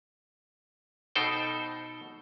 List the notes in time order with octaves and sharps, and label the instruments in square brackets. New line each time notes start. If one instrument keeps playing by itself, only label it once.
[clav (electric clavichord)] B2 D#4 A4 C5 G5